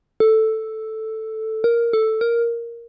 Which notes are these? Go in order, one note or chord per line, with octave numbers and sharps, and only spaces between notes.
A4
A#4
A4
A#4